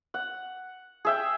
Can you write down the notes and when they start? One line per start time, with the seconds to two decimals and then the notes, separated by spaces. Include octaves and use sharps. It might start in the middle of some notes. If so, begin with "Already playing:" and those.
0.14 F#5
1.05 G#4 E5 G5